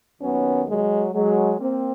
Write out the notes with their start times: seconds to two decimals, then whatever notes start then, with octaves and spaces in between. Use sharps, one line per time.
0.22 D#2 D#3 F#3 B3 C#4
0.68 F#3 G#3
1.14 F#3 G#3
1.60 A#3 C4